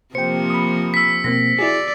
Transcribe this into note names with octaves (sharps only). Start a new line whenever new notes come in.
C3 F3 A#3 C5 G5 C#7
B5 D#6
E6 B6
B2 A#3 C4 A#6
E4 F#4 G#4 D5